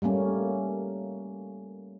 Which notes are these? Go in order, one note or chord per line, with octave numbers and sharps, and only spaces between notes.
G3 A3 A#3 C#4